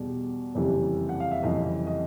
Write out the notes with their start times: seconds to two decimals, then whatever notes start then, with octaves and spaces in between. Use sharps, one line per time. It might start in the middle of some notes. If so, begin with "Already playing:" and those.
Already playing: E2 B2 G3
0.55 F#1 F2 C3 E3 G3
1.09 F#5
1.20 F5
1.31 E5
1.43 F#1 F2 C3 E3 G3 D#5
1.87 D#5